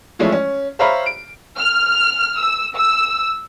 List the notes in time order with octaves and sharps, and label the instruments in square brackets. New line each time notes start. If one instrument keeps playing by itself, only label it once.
[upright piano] E3 F3 G#3 A3 C#4 E4
C#4
C5 C#5 E5 F5 A#5 B5
D7
[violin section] F6
E6
E6